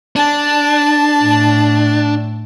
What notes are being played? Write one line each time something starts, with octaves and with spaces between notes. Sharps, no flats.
D4 A5
A2